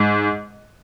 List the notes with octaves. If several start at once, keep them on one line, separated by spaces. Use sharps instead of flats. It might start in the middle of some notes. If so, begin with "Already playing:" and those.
Already playing: G#2